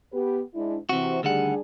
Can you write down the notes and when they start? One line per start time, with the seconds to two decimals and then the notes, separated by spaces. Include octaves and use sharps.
0.13 B3 G4 B4
0.55 G#2 D4 E4
0.89 C3 E3 C4 F#4
1.23 D2 D#3 G3 D4 G#4 F#5